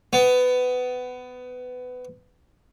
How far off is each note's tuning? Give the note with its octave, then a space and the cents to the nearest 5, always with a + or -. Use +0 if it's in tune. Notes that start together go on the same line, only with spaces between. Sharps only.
B3 +20